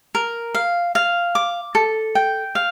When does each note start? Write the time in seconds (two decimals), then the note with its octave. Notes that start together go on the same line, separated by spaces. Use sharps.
0.15 A#4
0.54 F5
0.95 F5
1.35 D6
1.75 A4
2.15 G5
2.55 F5